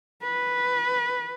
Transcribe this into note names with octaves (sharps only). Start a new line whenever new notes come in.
B4